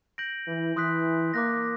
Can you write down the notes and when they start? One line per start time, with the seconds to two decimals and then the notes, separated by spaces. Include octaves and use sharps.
0.18 G6 A#6 D7 F#7
0.47 E3
0.76 E3 C6 D#6 F#6 B6
1.34 A#3 D6 F#6 A#6